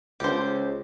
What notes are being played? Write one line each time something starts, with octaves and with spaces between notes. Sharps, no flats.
C#2 G4 C5